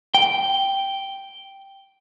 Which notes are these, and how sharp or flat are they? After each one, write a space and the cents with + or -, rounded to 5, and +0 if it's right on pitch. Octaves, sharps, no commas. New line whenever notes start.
G5 -5